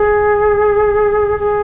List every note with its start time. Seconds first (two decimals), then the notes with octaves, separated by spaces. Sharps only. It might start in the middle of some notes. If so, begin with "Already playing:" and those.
Already playing: G#4
1.39 G#4